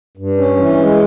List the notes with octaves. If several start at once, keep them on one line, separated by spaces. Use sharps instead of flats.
G2
C#4
E3
G#3